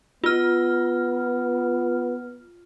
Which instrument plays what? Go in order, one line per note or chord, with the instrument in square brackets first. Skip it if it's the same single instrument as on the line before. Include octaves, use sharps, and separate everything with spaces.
[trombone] B3 [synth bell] F4 F6